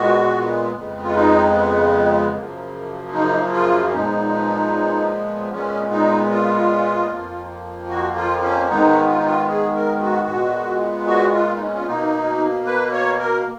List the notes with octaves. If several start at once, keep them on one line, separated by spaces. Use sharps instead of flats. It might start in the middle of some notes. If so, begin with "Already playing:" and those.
Already playing: A#2 G#3 B3 F#4
F2 C#3 G#3 B3
F4
D#4
F#2 C#3 F3 A#3
D#4
F4
C#4
A#2 F3 G#3 B3 D#4
A#2 G#3 B3 C#4
D#4
F4
F2 F3 A#3
F#4
F4
C#4
G#2 D#3 G#3 B3 D#4
F4
D#4
F4
G#4
A#4
F#4
A#2 G#3 B3
F#4
F4
D#4
C#4
F4
B2 A#3 D#4
B4
C#5
A#4